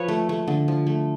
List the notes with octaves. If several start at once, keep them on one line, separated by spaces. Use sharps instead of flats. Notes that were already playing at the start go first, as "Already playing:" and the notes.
Already playing: F3 B4 C#5
A3
A3
D3
F3
A3